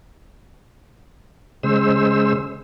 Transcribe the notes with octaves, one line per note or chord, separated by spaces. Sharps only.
C#3 G#3 C5 E6